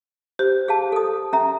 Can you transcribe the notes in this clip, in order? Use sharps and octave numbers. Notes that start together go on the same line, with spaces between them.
G4 C5
G#4 F5 A5
A4 D#6
C#4 E5 A#5